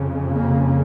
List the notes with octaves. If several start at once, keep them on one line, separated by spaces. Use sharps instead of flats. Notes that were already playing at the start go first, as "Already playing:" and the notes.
Already playing: F2 C#3
A#3